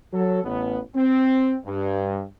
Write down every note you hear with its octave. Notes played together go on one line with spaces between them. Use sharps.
F#3 A4
A1 B3
C4
G2